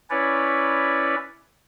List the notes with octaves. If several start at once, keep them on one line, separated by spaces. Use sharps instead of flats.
C#4 E4 B4 C#5 D5